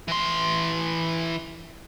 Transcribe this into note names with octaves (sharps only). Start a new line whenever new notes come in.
E3 C6